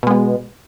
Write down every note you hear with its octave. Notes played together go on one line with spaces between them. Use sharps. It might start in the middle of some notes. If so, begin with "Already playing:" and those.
B2 G#3 B3